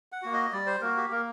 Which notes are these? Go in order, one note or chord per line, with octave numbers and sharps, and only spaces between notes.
F#5
A#3 F#4
D#5
G3 D5
C5
A#3 F#4 A#4
G4
A#3 A#4